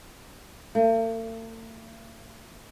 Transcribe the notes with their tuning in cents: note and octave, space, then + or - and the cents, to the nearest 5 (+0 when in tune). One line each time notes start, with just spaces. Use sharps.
A3 +45